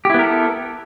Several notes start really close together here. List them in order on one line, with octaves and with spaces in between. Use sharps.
G4 E4 B3 A#4 A4